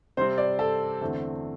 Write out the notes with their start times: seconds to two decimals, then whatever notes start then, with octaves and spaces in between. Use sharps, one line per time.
0.17 C3 G3 C4 C5
0.38 D5
0.59 A4
1.01 E2 D3 A3 C4